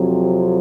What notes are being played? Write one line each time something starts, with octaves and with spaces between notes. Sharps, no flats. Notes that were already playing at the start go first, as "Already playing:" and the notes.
Already playing: F2 C3 F#3